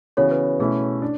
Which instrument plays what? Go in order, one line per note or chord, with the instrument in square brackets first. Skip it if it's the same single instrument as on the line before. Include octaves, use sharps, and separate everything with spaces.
[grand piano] C#3 E3 B3 F#4 [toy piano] A4 C#5
[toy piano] B4
[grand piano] B2 A3 C#4 E4 [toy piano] G#4
[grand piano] D4